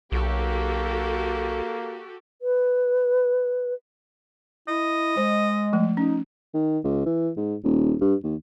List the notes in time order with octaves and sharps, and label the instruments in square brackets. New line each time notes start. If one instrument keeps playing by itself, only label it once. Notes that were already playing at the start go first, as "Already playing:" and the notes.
[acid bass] B1 [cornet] A#3 [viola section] F#4 G4 A4
[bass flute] B4
[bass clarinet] E4 [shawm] D#5
[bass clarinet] G#3 [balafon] C5
[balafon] F3 A3
[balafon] C#4 [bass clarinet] D#4
[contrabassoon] D#3
C#2
E3
G#2
D#1
G2
D#2